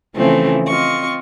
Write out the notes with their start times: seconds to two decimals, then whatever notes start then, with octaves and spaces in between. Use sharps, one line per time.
0.15 C#3 E3 F3 A3 C4 A4
0.67 C4 F4 D#5 C#6